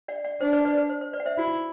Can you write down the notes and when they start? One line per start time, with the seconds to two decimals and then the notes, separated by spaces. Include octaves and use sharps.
0.08 D5 F#5
0.24 D5 F#5
0.41 D4 C5
0.53 B4 D5
0.65 B4 D5
0.77 B4
0.89 C5
1.01 C5
1.13 B4 D5
1.20 F#5
1.26 C5 E5
1.38 E4 F#4